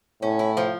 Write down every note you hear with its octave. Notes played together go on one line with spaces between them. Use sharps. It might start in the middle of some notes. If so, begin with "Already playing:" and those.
A2 C#4
E4
F3